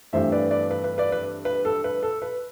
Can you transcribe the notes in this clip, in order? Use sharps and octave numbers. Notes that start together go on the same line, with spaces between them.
G2 E3 A3 C4 C5 E5
B4 D5
B4 D5
B4
B4
B4 D5
B4
B4
A4
B4
A4
B4